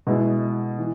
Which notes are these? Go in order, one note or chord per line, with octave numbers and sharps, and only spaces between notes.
B2 G#3 B3 E4
E3